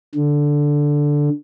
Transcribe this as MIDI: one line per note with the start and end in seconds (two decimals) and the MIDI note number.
0.15 1.29 50